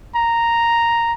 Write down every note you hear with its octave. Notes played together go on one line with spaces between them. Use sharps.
A#5